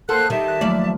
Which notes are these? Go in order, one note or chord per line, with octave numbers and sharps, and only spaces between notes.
A#3 A4 C5 F#5 C6 F#6
D#3 G3 E5 A5
F#6
D#2 F3 F#3 A3 D5